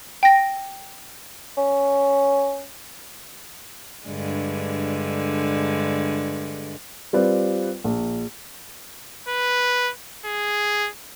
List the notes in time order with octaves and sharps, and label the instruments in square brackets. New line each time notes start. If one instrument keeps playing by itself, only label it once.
[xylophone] G5 A#6
[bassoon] C#4
[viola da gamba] G2 D3 G#3
[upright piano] G3 C4 F4 B4 D5
A#1
[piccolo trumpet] B4
G#4